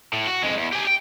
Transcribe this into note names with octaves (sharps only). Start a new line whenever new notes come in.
A2
F#4
F2 G#3
E2
G4 G#5
G5